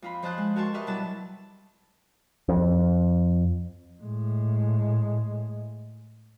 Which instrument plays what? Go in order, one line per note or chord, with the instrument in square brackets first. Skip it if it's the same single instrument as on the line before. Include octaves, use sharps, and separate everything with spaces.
[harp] F2 F4 B5
F3 C5 D#5 A5 F#6 G6
G#3
F#4 A#4 G5 A5 C6 C#6
G4 A#4 B4 D#5 E5
B2 F#3 G3 E4 B4 A5
[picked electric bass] F2
[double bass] A2 G#3